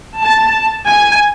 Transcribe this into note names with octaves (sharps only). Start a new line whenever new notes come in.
A5
G#5